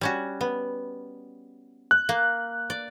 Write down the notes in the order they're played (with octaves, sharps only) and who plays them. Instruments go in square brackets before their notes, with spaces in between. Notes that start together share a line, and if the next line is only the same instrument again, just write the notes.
[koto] G3 C#4 F#4
B3
[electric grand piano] F#6
[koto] A#3
D5